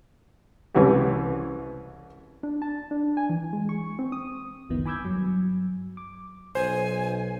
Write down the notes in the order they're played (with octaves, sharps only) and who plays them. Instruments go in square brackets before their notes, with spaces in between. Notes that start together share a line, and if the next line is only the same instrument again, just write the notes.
[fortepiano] C2 C#3 E3 C4 F#4 G4
[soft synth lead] D4
A5
D4
G#5
E3
G#3
C#6
C4
D#6
[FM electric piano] G1 C#2 F#2 D#3 B3 E4
G#5 B5 D6 E6 G6 G#6
G2 F#3
D6
[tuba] B1 [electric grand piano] C5 [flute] G#5